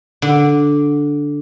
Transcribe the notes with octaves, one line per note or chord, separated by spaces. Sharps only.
D3